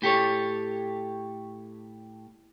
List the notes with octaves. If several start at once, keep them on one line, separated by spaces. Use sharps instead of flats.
A2 G4 A4 C#5